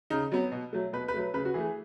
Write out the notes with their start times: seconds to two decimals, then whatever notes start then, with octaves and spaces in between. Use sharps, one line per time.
0.10 C#3 D#4
0.32 F#3 B3
0.52 B2
0.73 F#3 A3
0.93 B2 B4
1.08 B4
1.14 F#3 A3
1.34 C#3 B4
1.45 F#4
1.54 E3 A3 G#4